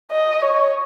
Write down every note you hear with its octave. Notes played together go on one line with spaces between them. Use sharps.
D#5
C#5